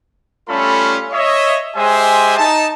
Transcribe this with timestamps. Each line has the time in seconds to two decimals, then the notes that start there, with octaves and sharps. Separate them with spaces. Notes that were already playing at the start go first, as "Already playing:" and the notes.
0.48 G3 A3 C#4 F4 A4 B5
1.11 C#5 D#5 E5
1.75 G#3 G4 C5 E5 G#5
2.38 D#4 A5